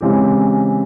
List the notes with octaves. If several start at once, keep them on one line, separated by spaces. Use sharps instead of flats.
C#3 E3 G#3 C4 G4